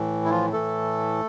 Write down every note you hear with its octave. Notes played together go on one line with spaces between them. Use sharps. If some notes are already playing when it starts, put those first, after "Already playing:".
Already playing: A2 E3
E4
F3 F4
A2 E3 A3 A4